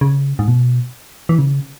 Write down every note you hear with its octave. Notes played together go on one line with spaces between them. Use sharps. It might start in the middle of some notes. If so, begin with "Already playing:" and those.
C#3
G#2
B2
E3
C#3